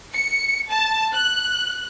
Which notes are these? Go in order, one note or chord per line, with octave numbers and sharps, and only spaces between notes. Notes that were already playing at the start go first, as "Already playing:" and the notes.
C#7
A5
F#6